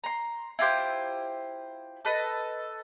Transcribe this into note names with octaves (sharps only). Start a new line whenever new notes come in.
A#5 C6
E4 F4 G4 C5
A4 B4 D#5